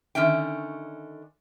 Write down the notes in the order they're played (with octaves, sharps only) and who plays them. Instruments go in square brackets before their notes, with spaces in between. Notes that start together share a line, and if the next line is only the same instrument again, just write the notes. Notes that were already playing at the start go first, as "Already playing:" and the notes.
[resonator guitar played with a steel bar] D3 D#3 C#4 E5 G5